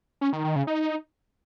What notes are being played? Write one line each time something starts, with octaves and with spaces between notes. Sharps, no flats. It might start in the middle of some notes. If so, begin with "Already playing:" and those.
C#4
D#3
D#3
C#3
D#4